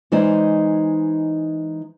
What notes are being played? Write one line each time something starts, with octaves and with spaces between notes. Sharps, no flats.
E3 G#3 D#4 C5 D5